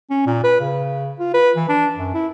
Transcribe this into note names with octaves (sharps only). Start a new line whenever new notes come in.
C#4
A#2
B4
C#3
F4
B4
E3
D4
F#2
E4